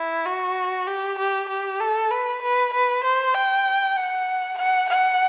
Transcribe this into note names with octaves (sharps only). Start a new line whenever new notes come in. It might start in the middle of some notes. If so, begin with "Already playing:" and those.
Already playing: E4
F#4
G4
G4
G4
A4
B4
B4
B4
C5
G5
F#5
F#5
F#5